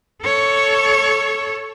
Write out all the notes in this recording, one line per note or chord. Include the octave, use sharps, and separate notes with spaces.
A4 C#5